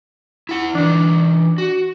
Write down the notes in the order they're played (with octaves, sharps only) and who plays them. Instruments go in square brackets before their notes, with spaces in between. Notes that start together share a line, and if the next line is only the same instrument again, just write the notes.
[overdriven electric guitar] E4 F#5
[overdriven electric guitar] E3 D#4 [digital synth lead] D4
[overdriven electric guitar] F#4